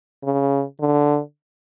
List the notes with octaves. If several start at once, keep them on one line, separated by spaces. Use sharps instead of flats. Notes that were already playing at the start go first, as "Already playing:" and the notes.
C#3
D3